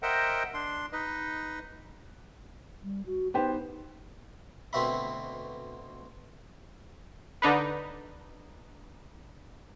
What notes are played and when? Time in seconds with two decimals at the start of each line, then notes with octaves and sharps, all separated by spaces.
0.03 A#4 C5 D#5 E5 F#5 G5
0.54 D4 C6
0.93 D#4 B4 D#5
2.83 G3
3.06 F#4
3.34 B3 D#4 G4 C5
4.73 D2 B2 C4 F#4 E5 B5
7.42 D3 D4 D#4 B4